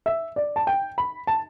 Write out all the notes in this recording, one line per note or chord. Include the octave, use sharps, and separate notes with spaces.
E5
D5
A5
G5
B5
A5